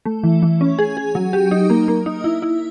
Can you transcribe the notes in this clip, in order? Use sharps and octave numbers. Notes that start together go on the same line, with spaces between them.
A3
E3
E3
C#4
G#4
G#4
F#3
G4
D#4
A#3
A#3
D#4
E4
E4